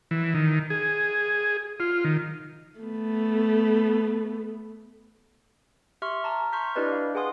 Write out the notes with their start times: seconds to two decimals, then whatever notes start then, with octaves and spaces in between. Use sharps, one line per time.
0.11 E3
0.34 D#3
0.70 G#4
1.80 F4
2.05 D#3
2.80 A3 B3
6.02 G4 E5 C6 C#6 F6
6.24 A5 A#5
6.53 C6 C#6 F6 G6 B6
6.75 D4 E4 G4 B4 D5 D#5
6.92 F5
7.15 G#4 B4 F#5 G#5 C6 D#6